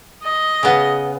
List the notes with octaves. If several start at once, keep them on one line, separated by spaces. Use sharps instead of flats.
D#5
C#3 B3